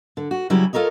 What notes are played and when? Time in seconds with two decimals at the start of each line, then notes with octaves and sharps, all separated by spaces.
0.17 D3
0.31 F#4
0.50 C#3 F#3 G3 C#4 E4
0.73 F4 A4 A#4 C#5 D#5